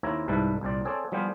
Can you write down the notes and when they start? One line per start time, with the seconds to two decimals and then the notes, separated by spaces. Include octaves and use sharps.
0.03 D#2 A#3 C4 E4 C#5 A#5
0.28 C2 G#2 G3 E4 B4 A5
0.61 C2 A#2 C4 D5
0.85 C4 G#4 A4 C#5 D5
1.12 F3 G3 B3 F4 G4 G#4